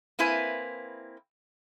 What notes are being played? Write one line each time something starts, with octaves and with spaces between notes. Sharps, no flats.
A#3 C4 E4 B4 G#5